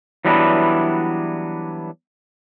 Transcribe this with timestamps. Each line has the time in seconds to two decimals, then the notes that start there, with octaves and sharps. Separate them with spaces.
0.25 E3 F#3 G3 B3 D4 E4